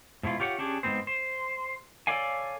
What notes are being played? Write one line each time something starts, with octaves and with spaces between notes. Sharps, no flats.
G#2 B2 E4 F4
F4 G4 C#5 F5 F#5
C#4 D4 G4 G#4
G#2 D#3 B3 C4 C5
C5
A4 A#4 C#5 D5 F5 G#5